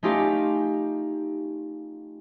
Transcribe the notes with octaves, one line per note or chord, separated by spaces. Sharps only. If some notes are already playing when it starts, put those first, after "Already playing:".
A3 C#4 D#4 F4 G4 F5